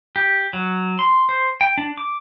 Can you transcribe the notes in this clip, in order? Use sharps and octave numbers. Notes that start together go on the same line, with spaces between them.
G4
F#3
C6
C5
G5
D4
D6